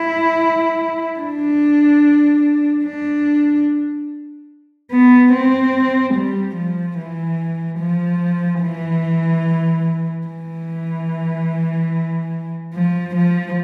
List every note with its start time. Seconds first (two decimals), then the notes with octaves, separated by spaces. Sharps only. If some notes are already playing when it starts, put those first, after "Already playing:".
Already playing: E4
1.20 D4
2.85 D4
4.91 B3
5.33 C4
6.15 G3
6.56 F3
6.98 E3
7.80 F3
8.62 E3
10.27 E3
12.74 F3
13.16 F3